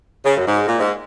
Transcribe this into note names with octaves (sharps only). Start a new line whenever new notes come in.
C#3
F#2
G#2
A#2
G#2